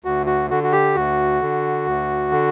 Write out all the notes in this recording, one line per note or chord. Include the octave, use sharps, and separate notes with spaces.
D2 F#4
F#4
D3 F#4
F#4
G4
D2 F#4
D3
D2
D3